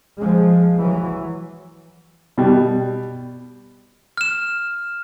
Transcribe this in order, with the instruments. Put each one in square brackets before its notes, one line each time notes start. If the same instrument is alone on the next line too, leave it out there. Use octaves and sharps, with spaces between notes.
[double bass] F3 G#3
E3 F#3
[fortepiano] B2 G3
[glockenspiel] F6 E7